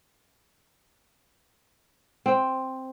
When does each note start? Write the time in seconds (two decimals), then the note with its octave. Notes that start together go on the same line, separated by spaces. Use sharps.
2.26 C4